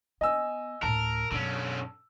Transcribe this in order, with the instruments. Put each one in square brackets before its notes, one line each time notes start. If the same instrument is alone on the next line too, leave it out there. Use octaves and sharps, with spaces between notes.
[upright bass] B3 [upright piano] D#5 G#5 E6
[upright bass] D2 A2 [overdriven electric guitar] A#4 [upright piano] A5
[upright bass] F#2 B2 [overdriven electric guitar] D3 C#4